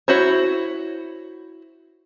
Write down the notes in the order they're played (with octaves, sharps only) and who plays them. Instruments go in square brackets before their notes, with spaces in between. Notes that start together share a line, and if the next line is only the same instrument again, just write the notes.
[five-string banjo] E4 F#4 C5 C#5